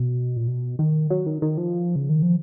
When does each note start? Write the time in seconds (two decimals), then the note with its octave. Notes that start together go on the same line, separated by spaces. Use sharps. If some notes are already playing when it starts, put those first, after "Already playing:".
Already playing: B2
0.36 A#2
0.48 B2
0.79 D#3
1.10 F#3
1.26 D#3
1.42 D#3
1.58 F3
1.96 C#3
2.09 D#3
2.22 F3